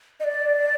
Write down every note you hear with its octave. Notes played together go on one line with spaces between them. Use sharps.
D#5
D5